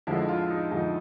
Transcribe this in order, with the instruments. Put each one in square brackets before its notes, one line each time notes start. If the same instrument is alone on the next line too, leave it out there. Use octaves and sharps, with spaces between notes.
[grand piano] F2 D3 F3 G#3 E4
F4
D#4
F2 D3 F3 G#3 D#4